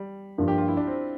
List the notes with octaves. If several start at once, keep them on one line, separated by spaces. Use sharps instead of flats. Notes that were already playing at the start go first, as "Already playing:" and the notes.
Already playing: G3
G2 F3 A#3 D4
G4
F4
E4
D4
C4